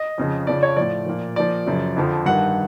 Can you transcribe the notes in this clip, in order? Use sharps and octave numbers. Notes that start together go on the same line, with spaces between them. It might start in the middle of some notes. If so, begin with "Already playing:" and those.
Already playing: D#5
F2 C#3 F3
F2 C#3 F3 D5
C#5
A2 F3 D5
A#2 F3
A#2 F3 D5
F#2 C#3 F3
F2 D3 F3
G2 D#3 F#5